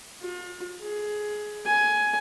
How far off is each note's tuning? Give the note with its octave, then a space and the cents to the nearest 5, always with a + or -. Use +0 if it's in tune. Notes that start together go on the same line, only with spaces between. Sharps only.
F4 +40
G#4 +15
G#5 +15